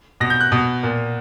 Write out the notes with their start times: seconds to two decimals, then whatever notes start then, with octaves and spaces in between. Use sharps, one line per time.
0.20 B2 A#6
0.30 G6
0.41 F#6
0.52 B2
0.83 A#2